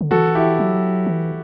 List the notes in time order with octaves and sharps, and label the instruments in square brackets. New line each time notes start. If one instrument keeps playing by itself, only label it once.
[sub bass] D3
[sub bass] E3 [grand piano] F#4 A4
[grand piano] E4 G4
[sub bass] F#3
E3